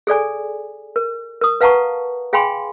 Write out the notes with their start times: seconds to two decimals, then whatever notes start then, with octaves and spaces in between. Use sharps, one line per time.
0.07 G#4 A4 D5 G#5
0.96 A#4
1.41 A#4 D#6
1.61 B4 F5 F#5 A5 A#5 C#6
2.33 G#4 F5 G5 G#5 B5 C6